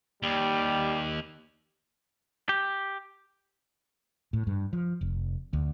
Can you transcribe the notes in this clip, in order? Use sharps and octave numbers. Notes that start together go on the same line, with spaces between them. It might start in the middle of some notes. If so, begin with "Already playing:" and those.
D#2 G3
G4
A2
G2
F3
F1
D2